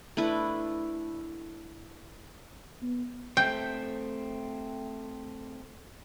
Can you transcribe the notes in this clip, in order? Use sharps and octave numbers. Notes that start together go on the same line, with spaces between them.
A3 D4 E4 B4
B3
A3 C4 G5